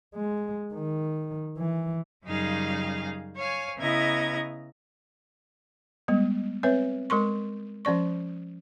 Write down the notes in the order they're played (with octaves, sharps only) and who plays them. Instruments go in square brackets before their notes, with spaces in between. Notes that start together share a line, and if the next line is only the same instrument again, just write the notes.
[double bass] G#3
D#3
E3
[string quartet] F#2 C#3 G3 D#4 G#4 F5
C#5 F5 G#5
C#3 B3 E4 D#5 A#5 G#6
[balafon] G3 G#3 B3
C4 B4 C#5 E5
G#3 A#4 C6 C#6
F3 C#4 D5 C#6